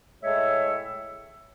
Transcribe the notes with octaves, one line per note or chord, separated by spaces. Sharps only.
A2 G#3 C#5 E5